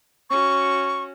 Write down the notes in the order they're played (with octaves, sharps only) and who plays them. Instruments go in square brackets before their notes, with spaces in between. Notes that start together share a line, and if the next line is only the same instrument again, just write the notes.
[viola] C#4 F#4 [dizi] C#6